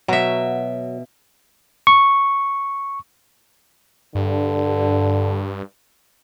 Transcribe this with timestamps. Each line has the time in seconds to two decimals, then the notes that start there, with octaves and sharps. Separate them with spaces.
0.08 B2 F#3 E5
1.87 C#6
4.15 G2 D3